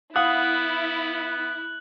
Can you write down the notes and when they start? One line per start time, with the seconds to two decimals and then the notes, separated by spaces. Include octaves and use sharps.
0.16 B3 E4 F5 F#5 D#6 F#6 F#7